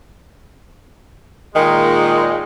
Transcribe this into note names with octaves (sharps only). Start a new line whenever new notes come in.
A#2 D#3 G#3